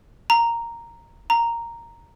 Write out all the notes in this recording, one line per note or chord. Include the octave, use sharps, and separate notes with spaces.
A#5
A#5